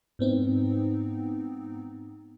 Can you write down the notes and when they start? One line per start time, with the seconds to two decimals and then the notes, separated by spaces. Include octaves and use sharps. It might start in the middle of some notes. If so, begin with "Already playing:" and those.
0.19 G#2 B3 C4 D#4